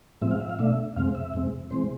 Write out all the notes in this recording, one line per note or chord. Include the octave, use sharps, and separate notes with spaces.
A2 F3 G#3 C4 E5
F5
E5
F5
B2 A3 D4 E5
F2 C3 G#3 C4 F5
E5
F2 C3 G#3 C4
C3 E3 G#3 C4 C5